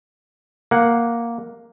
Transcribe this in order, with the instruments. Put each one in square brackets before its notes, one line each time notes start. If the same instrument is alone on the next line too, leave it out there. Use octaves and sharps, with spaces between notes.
[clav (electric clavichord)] A#3 F#5